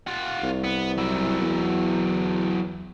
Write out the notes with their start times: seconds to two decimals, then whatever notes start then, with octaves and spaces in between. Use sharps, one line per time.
0.07 F4 F#5
0.43 C2
0.64 B3
0.97 F#3 E4
1.41 E2